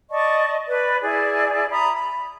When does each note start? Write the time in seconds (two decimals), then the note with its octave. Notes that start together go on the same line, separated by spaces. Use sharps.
0.11 D5 D#5 A5 C#6
0.69 B4 D5 B5
1.02 E4 G#4 D5 G#5
1.70 E5 A#5 B5 D#6
1.93 B5